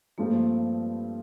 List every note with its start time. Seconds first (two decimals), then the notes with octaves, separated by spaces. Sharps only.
0.18 G2 F3 A3 A#3 C4